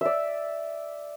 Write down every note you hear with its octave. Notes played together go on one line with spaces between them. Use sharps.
D5 E5